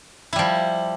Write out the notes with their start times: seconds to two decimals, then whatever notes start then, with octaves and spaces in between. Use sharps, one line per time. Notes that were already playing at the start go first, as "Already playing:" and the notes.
0.33 E4
0.36 G3
0.39 F3